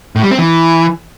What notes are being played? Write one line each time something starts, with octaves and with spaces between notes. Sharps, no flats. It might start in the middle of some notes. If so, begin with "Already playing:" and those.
A2
G3
C4
E3